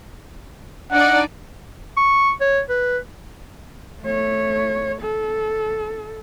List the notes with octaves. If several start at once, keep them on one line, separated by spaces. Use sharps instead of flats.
D4 D#4 D5 F#5
C#6
C#5
B4
A3 C#5
A4